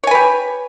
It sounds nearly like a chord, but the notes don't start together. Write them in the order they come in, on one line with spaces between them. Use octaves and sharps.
C#5 G#5 B4 G4